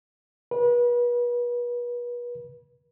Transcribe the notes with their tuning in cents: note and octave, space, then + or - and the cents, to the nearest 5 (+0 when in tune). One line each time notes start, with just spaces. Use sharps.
B4 -35